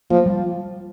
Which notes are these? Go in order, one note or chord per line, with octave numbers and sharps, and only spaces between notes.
F3 A#3
G3